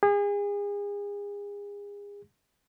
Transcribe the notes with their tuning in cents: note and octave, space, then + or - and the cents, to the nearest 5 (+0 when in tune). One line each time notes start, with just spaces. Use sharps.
G#4 -35